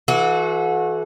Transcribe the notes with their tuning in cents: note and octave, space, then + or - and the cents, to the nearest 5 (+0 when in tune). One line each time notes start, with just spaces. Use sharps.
E3 +0 F#4 -30 A4 -40